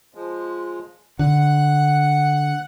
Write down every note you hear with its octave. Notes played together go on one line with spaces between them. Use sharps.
F3 G#3
D3 F#5 F#6